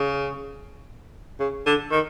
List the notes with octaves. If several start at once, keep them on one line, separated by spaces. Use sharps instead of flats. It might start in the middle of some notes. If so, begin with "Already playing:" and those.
Already playing: C#3
C#3
D3
D#3